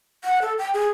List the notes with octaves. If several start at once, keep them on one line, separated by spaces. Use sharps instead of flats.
F#5
A4
G5
G#4